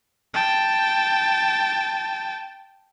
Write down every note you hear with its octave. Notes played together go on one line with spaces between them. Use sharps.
G5 A5